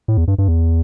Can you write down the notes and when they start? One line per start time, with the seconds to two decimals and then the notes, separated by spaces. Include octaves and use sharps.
0.08 A2
0.17 E2
0.28 G2
0.38 G2
0.48 E2